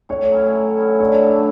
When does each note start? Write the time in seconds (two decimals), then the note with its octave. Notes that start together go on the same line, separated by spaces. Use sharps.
0.09 A2 C#5
0.32 F#3 C#4 E4
0.55 A2
0.77 F#3 C#4 E4
1.00 D3 C#5
1.23 A3 D4 A4